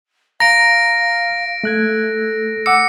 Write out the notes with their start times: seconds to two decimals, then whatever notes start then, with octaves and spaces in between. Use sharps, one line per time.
0.40 F5 A#5 A#6 D7
1.64 A3 A4 F#6 G#6
2.66 F#5 D6 E6 C#7